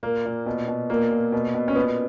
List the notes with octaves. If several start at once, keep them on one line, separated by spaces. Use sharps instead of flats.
A#2 A#3
A#2
B2
B2
A#2 A#3
A#2
B2
B2
C#4
A#2 B3